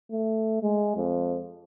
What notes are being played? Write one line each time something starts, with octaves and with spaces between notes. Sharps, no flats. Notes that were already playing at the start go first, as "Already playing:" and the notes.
A3
G#3
F2